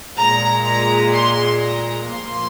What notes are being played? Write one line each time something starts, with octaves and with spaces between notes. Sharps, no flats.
A#2 G#3 A#5
A#5
C6
A#5
A#2 F3 A#3 C6